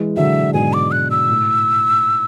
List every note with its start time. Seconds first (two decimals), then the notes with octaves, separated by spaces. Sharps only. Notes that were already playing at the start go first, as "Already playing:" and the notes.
Already playing: E3 G#3
0.17 D3 F#3 E5
0.54 G#2 B2 G#5
0.73 D6
0.91 F#6
1.11 E6
1.29 A2